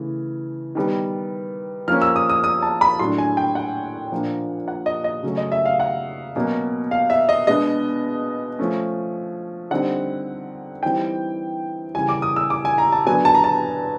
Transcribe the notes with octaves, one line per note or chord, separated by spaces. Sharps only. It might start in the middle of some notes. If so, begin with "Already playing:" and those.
Already playing: C#3 E3 A3
D#3 G3 B3
F3 A#3 C#4 F6
E6
D#6
D#6
D#6
A5
B5
A2 F#3 A3 D4 C6
G#5
G5
F#5
A#2 F3 A#3 D4
F#5
D#5
D#5
C#3 F#3 A3 C#4
D#5
E5
F5
F#5
B2 F#3 A#3 C#4
F5
E5
D#5
B2 G#3 B3 D4 D#5
F3 A3 C#4
D3 G3 C4 D#4 F#5
E3 G3 C4 D#4 G5
C#3 E3 G3 G#5
D6
D#6
E6
D6
G#5
A#5
A5
D3 F#3 B3 D4 G#5
A5
A#5
A5